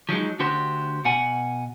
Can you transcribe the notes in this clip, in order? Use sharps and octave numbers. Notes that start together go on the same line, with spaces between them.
F3 F#3 G#3 D#4
D2 D4 F#4 G4 C5
B2 F#5 G#5